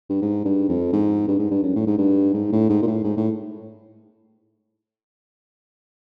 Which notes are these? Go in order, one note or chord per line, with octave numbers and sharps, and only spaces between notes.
G2
G#2
G2
F2
G#2
G2
G#2
G2
F#2
A2
G#2
G2
G#2
A2
G#2
A#2
A2
G#2
A2